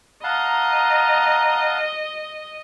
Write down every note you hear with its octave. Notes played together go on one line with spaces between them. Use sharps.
D#5 F5 F#5 A5 A#5